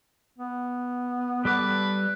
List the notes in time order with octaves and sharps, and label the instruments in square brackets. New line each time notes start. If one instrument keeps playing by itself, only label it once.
[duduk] B3
[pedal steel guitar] G3 A4 D6 [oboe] B4